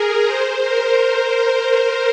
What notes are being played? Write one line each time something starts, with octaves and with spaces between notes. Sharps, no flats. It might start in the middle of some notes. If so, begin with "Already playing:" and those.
Already playing: G#4 A#4
C5
A#4